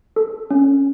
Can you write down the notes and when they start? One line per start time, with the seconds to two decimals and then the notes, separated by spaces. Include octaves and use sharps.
0.16 A4
0.51 C#4